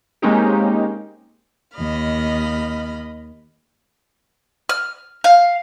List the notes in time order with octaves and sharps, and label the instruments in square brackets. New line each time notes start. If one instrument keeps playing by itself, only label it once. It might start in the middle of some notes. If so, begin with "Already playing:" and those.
[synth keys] G#3 A#3 C4 C#4 D#4 G4
[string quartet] D#2 D#5 B5 F6
[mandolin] F6
F5